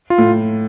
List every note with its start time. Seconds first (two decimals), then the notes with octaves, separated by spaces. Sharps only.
0.10 F4
0.18 A2